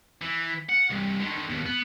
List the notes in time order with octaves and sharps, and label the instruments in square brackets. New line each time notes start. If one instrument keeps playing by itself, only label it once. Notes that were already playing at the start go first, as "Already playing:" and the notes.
[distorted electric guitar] E3
F#5
C2 G2
D3 D#3
D#2 B2
B3